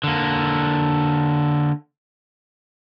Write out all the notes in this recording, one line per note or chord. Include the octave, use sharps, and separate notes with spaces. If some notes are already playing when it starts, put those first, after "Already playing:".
D3 A#3